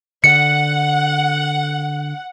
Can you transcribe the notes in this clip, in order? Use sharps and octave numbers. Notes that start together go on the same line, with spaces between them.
D3 F#5 C#7